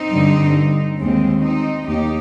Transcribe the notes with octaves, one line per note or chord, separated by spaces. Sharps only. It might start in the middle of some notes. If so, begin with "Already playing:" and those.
Already playing: C4 D#4
G2 D3
D#2 D#3 G#3 C4
C4 D#4
D#2 D#4 G4